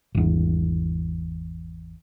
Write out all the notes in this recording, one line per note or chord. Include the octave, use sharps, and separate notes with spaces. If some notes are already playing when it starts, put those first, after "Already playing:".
G#1 E2